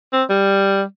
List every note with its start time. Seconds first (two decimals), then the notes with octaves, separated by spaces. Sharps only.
0.12 C4
0.29 G3